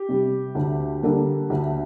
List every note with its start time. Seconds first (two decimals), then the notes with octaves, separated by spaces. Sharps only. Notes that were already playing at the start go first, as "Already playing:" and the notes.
Already playing: G4
0.09 C3 G3
0.55 D2
1.03 D3 G3 A#3
1.50 D2